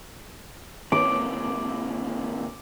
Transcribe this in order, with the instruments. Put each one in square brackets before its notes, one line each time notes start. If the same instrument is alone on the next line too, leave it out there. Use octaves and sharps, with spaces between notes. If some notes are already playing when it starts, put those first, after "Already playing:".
[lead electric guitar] D#2 C3 [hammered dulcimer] D6